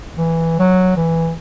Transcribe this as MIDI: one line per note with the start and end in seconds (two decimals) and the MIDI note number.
0.17 0.56 52
0.59 0.92 54
0.97 1.32 52